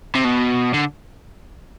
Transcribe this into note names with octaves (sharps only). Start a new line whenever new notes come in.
C3
B2
D3